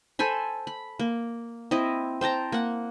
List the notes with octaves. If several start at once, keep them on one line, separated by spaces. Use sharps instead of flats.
A4 C5 G#5 B5
B5
A#3
C4 E4 D#5
C5 G5 A5 A#5
A#3 F#5